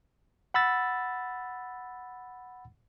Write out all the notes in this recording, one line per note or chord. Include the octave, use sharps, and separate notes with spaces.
F#5 B5 E6 A6